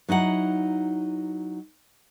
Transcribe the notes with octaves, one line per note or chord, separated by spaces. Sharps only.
F#3 D#4 E4 F#5